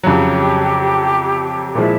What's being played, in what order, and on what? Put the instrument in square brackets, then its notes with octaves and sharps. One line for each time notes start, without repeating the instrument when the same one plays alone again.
[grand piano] F2 C#3 F#3 [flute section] G4
[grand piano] A#2 F3 G#3 [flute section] E4